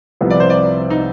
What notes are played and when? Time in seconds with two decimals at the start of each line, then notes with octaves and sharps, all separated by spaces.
0.21 C2 C3 F3 B3
0.30 D5
0.40 C5
0.50 D5
0.90 D#4